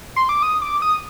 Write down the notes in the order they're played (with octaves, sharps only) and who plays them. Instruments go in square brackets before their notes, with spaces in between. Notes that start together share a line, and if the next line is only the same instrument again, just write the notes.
[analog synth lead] C6
D6
D#6
D6
D#6